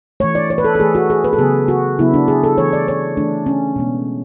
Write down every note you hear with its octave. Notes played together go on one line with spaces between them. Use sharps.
E3 A3 C#5
D5
C#5
B4
A4
A4
E3 A3 G#4
F#4
G#4
B4
A4
C#3 F#3 B3 G#4
F#4
C#3 F#3 B3 E4
D4
G#4
A4
E3 A3 C#5
D5
C#5
E3 A3 D4
C#4
B2 G#3 B3